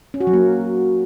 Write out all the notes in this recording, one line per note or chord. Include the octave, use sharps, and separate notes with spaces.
C#4
F#4
F#3
A#3